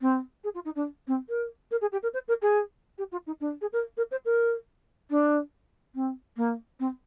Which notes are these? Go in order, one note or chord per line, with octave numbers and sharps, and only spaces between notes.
C4
G#4
F4
D#4
D4
C4
A#4
A#4
G#4
G4
A#4
C5
A#4
G#4
G4
F4
D#4
D4
G#4
A#4
A#4
C5
A#4
D4
C4
A#3
C4